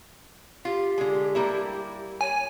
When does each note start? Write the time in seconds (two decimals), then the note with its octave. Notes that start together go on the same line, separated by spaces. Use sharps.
0.65 F4 G4
0.98 D3 G#3
1.35 G3 A#3 E4
2.21 C#5 G#5